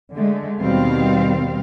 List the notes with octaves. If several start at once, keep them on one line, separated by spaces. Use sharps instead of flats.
D3 G#3 A3
D#2 B2 D#3 G3 C4 F5